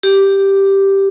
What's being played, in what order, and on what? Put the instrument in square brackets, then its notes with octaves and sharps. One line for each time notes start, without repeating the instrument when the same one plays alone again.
[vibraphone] G4